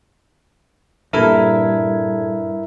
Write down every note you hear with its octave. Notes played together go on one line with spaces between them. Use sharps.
G2 A#2 E4 A4 A#4 E5 G#6